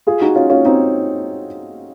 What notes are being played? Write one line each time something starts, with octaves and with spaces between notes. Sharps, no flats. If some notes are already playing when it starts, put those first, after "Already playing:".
F4 G#4
D#4 F#4
C#4 F4
C#4 F4
C4 D#4